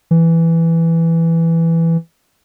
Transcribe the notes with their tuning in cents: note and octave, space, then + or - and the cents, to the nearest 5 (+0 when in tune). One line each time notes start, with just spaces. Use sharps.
E3 +5